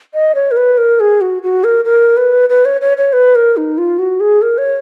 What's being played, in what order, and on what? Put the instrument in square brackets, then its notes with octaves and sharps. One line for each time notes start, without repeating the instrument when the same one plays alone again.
[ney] D#5
C#5
A#4
B4
A#4
G#4
F#4
F#4
A#4
A#4
B4
B4
C#5
C#5
C#5
B4
A#4
D#4
F4
F#4
G#4
A#4
C#5